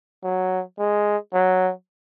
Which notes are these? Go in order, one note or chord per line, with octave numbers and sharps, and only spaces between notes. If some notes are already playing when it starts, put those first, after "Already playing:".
F#3
G#3
F#3